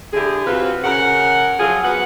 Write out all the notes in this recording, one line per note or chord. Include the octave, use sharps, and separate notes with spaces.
D3 E4 G4 G#4
C3 C4 F4 F#4 B4
C#3 A#4 F#5
F3 F#3 F4 G#4
F#3 B3 F#5